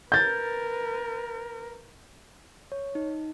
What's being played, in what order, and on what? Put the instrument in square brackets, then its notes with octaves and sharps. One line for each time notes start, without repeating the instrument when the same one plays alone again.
[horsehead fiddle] A#4 B4 [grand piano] G6 A6
[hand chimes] C#5
D#4